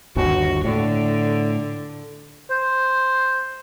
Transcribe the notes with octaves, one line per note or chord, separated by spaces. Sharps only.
G1 D#2 F#4
A2 D3
C5